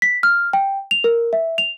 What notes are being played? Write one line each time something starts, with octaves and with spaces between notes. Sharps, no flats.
B6
F6
G5
F7
A#4
E5
F7